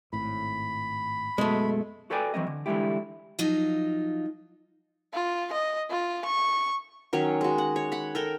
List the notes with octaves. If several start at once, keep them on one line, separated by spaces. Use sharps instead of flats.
G#1 A2 B5
F#2 B2 G#3 A3
F#4 A4 B4 D5 G5 G#5
E3 F#3 C4 D#5
D3
D3 E3 G3 G#3 E4 G4
F3 F#3 D#4 F4
F4
D#5
F4
C#6
D#3 F#3 C#4 C#5
G#3 F#4
F#5
C#5
F#5 B5
A4 A#4 G5